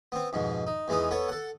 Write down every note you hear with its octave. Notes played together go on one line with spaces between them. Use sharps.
B3 C4
F2 G#2 B2
D#4
E2 E3 G#3 B3 D#4
B3 A4 C#5
A4 F#5